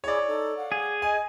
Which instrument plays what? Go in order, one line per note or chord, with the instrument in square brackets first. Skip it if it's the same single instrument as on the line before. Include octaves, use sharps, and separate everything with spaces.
[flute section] E4 G#4 [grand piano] C#5 D5
[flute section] D#4 A4
F5 F#5
[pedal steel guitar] G#4
[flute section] D#5 [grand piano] G#5